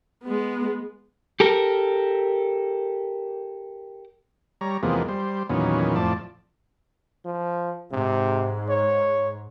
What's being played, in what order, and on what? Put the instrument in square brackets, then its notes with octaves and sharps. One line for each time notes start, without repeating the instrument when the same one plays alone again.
[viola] G#3 B3
[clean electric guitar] G4 A4 A#4
[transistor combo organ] G3 C#5 A#5
E2 C3 F3 G#3 A#3 B3
G3 C5
E2 A#2 D#3 F#3 B3 C#4
F2 A2 F3 D5 A5
[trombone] F3
[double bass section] G#2 [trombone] C3
[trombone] C#5